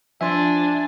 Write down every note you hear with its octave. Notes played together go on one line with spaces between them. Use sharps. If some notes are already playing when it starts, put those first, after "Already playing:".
F3 D4 E5 G#5 C6